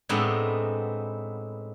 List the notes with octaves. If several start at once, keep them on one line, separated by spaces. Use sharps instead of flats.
A2 G#3 B3 C4 D4 D#4